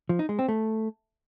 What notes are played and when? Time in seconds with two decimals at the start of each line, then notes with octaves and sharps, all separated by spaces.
0.09 F3
0.19 D#4
0.29 G#3
0.39 C4
0.48 A3